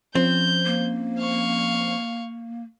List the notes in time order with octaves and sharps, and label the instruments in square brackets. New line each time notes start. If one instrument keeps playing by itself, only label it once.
[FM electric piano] F3 C#4 C5 [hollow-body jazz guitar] C4 [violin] G6
[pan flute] A#3
[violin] F5 C#6